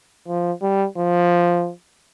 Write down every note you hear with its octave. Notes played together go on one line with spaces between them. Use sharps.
F3
G3
F3